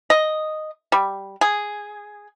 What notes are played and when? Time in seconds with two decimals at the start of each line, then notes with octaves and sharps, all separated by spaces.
0.10 D#5
0.92 G3
1.41 G#4